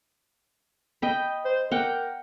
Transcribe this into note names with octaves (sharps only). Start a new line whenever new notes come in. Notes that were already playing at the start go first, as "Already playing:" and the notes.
D#5 G5 B5
C5
A#4 F#5 G5 D6